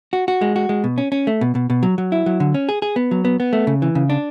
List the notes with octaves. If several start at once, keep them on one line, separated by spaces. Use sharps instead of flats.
F#4
F#4
G#3
F#4
G#3
B2
C#4
C#4
A3
B2
B2
B2
F#3
F#3
E4
F#3
D3
C#4
G#4
G#4
B3
F#3
B3
B3
A3
C#3
E3
C#3
D4